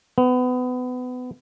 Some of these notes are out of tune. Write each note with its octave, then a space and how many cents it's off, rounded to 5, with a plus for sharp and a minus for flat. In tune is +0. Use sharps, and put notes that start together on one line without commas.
B3 +25